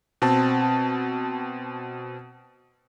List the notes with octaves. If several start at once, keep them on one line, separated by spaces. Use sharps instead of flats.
B2 C4 A5